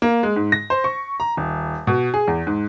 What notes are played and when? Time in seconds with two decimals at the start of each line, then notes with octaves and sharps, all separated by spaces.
0.02 A#3
0.23 G#3
0.36 G#2
0.52 A#6
0.70 C5
0.84 C#6
1.20 A#5
1.37 D#1
1.87 B2
2.14 G#4
2.28 E2
2.47 G#2